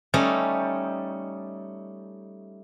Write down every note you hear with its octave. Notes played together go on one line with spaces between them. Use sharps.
G3 A3 C#4 D#4